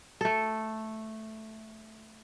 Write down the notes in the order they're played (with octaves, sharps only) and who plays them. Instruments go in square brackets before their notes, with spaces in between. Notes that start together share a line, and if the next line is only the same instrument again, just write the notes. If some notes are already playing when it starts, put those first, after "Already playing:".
[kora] A3 A4